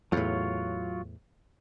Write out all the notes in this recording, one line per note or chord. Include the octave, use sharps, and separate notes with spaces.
E2 A2 F#3 F4 C#5